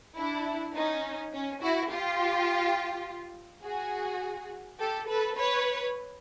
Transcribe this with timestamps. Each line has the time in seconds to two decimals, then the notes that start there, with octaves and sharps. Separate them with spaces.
0.17 D4 E4
0.74 C#4 D#4
1.32 C#4
1.61 E4 F#4
1.90 F4 G4
3.63 F#4 G#4
4.79 G4 A4
5.08 A4 B4
5.37 B4 C#5